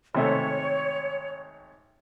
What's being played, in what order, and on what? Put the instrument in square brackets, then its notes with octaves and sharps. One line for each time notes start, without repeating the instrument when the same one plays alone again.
[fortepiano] G#1 C3 A3 [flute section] C#5